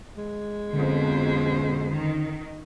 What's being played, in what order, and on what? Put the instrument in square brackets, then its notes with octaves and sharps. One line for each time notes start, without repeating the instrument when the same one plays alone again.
[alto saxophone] G#3
[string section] F2 B2 [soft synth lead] D3 [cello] C#4 C5
[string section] D#3